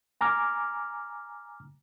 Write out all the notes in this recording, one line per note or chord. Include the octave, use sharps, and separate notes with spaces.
G#5 A#5 D6 F6